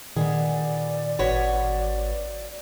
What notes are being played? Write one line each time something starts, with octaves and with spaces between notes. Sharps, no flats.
A#2 D#3 B3 G#4 D5
G#1 F#4 B4 C#5